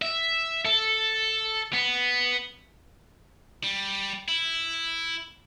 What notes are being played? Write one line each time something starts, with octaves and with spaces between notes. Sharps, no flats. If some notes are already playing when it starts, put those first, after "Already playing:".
E5
A4
B3
G3
E4